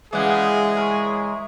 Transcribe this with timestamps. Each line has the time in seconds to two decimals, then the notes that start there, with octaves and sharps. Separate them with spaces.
0.13 C#3 E3 G#3 G#4 D5 F#5
0.77 A#4 C#5